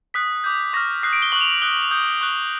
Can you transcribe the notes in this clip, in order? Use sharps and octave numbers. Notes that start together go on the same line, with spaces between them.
D#6 F#6 B6
D6 G6
C#6 F6 A#6
D#6 F#6 C7
D7
G7
C#6 F#6 F#7
F7
F#7
D#6 F#6 G7
F#7
F7
D#6 G6
C#6 F#6